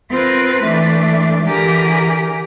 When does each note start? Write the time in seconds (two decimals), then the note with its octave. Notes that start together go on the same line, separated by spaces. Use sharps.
0.11 C4 F4 A#4 B4
0.64 E3 A3 D4
1.44 D3 E3 G4 G#4 A#4